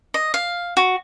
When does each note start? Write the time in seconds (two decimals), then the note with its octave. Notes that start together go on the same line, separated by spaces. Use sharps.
0.14 D#5
0.34 F5
0.77 F#4